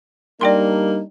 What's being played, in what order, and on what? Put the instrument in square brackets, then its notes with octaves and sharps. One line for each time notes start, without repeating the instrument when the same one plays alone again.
[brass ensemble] G3 D4 D#4 [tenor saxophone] A#3 [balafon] D5 G5 C6